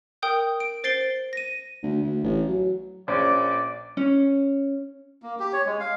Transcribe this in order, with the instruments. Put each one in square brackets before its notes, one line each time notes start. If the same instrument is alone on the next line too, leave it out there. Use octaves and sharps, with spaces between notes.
[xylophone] A#4 G5 D#6 G6
D7
C5 A6 C7 D7 G7
A#6 D#7
[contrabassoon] D2
D2
A1
F#3
[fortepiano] A#1 C#4 C5 [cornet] D5
[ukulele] C#4
[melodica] A#3
G4
C#5
G#3
F5